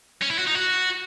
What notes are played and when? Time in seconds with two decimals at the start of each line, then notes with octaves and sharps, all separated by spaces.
0.22 C#4
0.30 E4
0.38 F#4
0.47 D#4
0.55 F#4